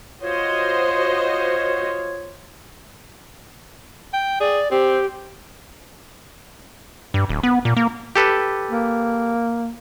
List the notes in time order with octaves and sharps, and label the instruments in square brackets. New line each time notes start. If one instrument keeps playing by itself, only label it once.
[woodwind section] F4 C#5 [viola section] F#4 C5 D#5
[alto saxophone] G5
[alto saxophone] G#4 [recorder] D5
[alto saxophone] C4 [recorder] G4
[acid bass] G2
D1
B3
A#2
A#3
[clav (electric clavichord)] G4 A4 B4
[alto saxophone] A#3